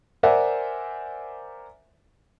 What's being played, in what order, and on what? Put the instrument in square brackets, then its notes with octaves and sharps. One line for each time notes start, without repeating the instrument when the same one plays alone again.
[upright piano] A#4 C5 D5 E5 F#5 G#5